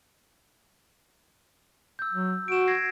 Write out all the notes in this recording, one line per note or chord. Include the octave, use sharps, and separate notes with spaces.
E6 G6
F#3
F#4 D7 E7
G#6 A#6 C7